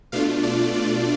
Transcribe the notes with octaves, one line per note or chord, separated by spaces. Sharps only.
B2 A3 D4 F4 F5
D5
D5